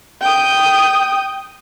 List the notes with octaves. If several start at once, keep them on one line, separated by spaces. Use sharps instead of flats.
G5 D#6